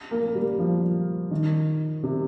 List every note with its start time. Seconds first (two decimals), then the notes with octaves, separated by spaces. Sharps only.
0.11 A#3
0.26 A#3
0.35 G3
0.59 F3
1.31 D#3
2.03 C3